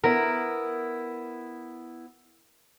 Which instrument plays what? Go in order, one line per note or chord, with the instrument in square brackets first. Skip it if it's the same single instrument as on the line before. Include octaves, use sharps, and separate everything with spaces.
[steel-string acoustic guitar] B3 E4 [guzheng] A#4